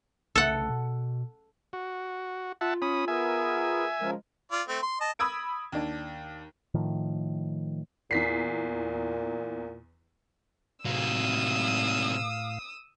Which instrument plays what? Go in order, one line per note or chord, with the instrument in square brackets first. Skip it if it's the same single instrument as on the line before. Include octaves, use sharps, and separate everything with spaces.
[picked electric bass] C2 C#3 A3 [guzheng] A4 F#5
[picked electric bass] B2
[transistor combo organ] F#4
[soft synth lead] F4 [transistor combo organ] E5 F#5 A5
[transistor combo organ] C#4 B5 D#6
[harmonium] B3 G#4 A#4 [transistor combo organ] E5 G#5
[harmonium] C#3 F3 A#4 [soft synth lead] G#3
[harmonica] F4 D5
A3 C4
C6
D#5 A5
[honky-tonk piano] B5 D#6 E6 G#6 D7
D#2 D4
[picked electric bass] A2 D#3 F3
[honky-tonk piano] E2 B6 C7 [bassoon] A#2
[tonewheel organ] A2 F5 [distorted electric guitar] C3 F#3 [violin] D#6 E6